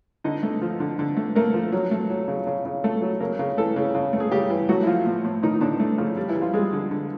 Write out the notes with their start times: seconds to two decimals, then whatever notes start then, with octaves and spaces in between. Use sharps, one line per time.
0.24 D3 D#4 D#5
0.43 A3
0.62 F3
0.80 D3
0.99 D3
1.17 A3
1.35 A3 A#3 A#4
1.54 F3
1.72 F#3
1.91 A3
2.10 F#3
2.28 C#3
2.47 C#3
2.65 C#3
2.84 A3 A4
3.02 F#3
3.20 C#3 A#3 A#4
3.39 C#3
3.57 E3 A3 A4
3.76 C#3
3.95 C#3
4.13 A3
4.20 G#4
4.31 C#3 G3 G4
4.50 E3
4.69 F#3 A3 F#4
4.83 E4
4.87 F3 F4
5.06 A2
5.25 A2
5.43 A2 D#3 D#4
5.61 A2 D3 D4
5.80 A3
5.98 C#3 F3 C#4
6.17 G3
6.29 E3 E4
6.35 G3
6.41 F3 F4
6.53 G3 G#3 G#4
6.73 D3
6.91 D3